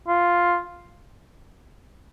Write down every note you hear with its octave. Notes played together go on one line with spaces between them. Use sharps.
F4